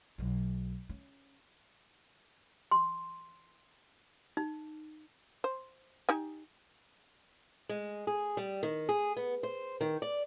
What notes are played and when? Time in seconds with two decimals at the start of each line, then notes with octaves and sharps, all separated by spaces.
0.18 B1 F#3
0.89 C#4
2.71 C6
4.37 D#4
5.44 C5
6.09 D#4 G4 G#5
7.69 G#3
8.07 G#4
8.37 G3
8.63 D#3
8.89 G#4
9.17 B3
9.43 C5
9.81 D#3
10.02 D5